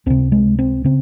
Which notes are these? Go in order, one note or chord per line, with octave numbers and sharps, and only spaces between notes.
C#2 C3 C4
G#3
C4
C#3 C4